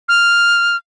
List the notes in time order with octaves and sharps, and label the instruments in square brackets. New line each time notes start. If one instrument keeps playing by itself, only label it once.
[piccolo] F6